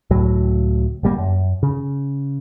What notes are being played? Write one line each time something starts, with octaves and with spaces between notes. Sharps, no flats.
C#2 A2 F#3
G1 G3 A#3
F#2
C#3